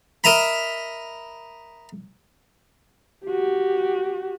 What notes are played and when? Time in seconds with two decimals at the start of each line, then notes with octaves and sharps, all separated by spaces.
0.24 A#4 D#5 E5 A#5 B5
3.25 F#4 G4